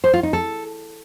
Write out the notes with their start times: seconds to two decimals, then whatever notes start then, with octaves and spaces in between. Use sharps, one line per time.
0.04 C5
0.14 F4
0.23 D#4
0.33 A4